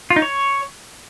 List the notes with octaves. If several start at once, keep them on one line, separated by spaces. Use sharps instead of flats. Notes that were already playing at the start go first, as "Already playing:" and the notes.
F4
D#4
C#5